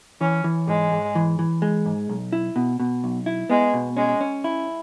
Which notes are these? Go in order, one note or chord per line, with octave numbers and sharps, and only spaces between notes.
E3 C#4
E3
G#2 G#3
G#2
E3
E3
G#3
G#2
B1
E4
B2
B2
B1
E4
G#3 B3
B2
G#3 C#4
C#4
E4